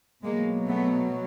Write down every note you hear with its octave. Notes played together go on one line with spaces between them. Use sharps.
B2 F#3 G#3 A#3
A3 B3